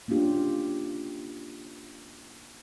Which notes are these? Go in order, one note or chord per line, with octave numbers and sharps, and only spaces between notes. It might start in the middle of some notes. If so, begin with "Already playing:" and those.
A#3 C#4 D4 F4 G4